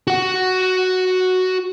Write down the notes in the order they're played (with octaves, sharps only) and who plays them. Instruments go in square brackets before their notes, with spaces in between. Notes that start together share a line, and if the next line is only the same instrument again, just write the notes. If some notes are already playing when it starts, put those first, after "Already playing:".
[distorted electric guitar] F#4 F#5